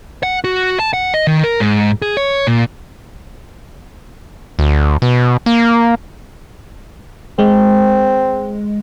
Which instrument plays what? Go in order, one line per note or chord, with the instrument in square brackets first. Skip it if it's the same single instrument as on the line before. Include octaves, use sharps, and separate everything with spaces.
[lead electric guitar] F#5
F#4
A5
F#5
D#5
D#3
A#4
G#2
G#4
C#5
A#2
[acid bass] D2
B2
A#3
[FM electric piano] G#3 [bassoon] C4